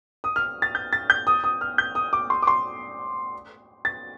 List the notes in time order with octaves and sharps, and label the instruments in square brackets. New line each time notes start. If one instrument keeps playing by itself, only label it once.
[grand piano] D#6
F6
A6
G6
A6
G6
D#6
D#6
F6
G6
D#6
D6
C6
D6
C6
A6